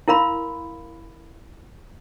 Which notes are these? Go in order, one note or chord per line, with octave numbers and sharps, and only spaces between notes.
E4 A#4 F5 B5 C6